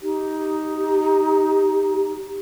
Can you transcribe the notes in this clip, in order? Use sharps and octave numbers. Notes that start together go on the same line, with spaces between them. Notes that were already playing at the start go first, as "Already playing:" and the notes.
D#4 G4